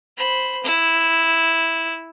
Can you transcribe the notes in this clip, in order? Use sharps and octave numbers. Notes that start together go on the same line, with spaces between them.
C5 B5
E4